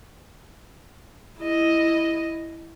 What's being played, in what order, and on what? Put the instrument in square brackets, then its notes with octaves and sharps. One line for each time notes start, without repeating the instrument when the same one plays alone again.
[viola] E4 D#5